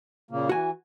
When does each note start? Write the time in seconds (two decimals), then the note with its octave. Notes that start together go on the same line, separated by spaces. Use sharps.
0.31 A#2 C#3 A#3
0.49 E3 F#4 G#5